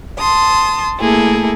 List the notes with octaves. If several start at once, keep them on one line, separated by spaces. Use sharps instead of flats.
A5 C6 D#6
A3 A#3 E4 G#4 A4